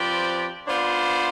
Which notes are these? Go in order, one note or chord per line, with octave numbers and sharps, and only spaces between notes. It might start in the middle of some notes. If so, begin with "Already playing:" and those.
Already playing: F3 C4 G4 B4 D5
B3 D4 F4 C5